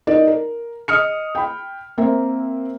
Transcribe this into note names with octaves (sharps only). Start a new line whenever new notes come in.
D#4 A#4 D5
A#4
D#5 D#6 F6 C#7
G5 B5
A#3 C4 A#4 E5